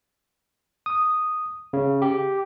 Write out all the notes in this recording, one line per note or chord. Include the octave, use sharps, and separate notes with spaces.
D#6
C#3
G4